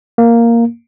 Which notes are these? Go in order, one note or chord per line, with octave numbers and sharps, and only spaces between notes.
A#3